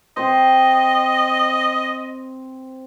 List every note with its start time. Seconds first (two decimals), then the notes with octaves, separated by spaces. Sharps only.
0.17 C4 C5 D#5